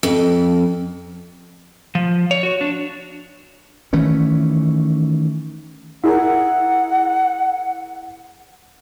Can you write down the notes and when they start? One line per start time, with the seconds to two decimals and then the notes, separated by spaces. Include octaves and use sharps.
0.03 F2
1.95 F3
2.31 C#5
2.43 F#4
2.61 D4
3.93 D#3 E3 A3 C#4
6.04 E4 G#4 A#4 F#5